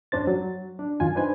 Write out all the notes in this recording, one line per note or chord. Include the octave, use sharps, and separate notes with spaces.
F#2 C#4 D4 C5 A6
F#3
D4
F#2 D#3 F4 G#5
D4 D#4 B4 C5 G#5